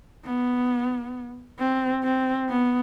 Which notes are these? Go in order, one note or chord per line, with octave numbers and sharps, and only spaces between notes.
B3
C4
C4
B3